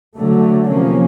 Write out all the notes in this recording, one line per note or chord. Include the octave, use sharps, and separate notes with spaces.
D3 F#3 A3
C3 F3 A#3 C#4